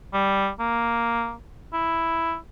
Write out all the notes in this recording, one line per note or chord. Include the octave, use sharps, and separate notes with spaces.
G3
A#3
E4